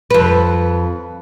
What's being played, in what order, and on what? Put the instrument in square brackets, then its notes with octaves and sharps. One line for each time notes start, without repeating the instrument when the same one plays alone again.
[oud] F2 B4